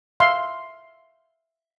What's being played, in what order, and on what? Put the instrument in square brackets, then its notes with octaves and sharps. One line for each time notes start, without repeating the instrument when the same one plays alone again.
[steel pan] E5 F5 C6